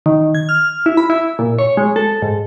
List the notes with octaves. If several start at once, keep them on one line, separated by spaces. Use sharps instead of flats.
D#3
G#6
F6
E4
B5
E4
A#2
C#5
G#3
A4
G#2